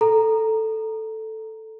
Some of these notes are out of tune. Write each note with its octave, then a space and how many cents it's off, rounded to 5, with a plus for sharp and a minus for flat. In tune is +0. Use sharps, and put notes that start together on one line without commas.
A4 +0 A#5 +0